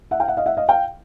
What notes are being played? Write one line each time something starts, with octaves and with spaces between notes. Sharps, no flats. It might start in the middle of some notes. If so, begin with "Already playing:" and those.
E5 F#5
F5 G5
E5 F#5
D#5 F5
E5 F#5
D#5 F5
F5 G5